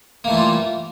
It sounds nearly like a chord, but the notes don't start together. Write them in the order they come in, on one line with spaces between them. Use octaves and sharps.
A#3 A3 E3 G3 F4